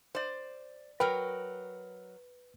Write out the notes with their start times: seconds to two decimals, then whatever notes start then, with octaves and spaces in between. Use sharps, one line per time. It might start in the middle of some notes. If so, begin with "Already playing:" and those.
0.15 C5 D5
1.00 F#3 A#4 B4 G5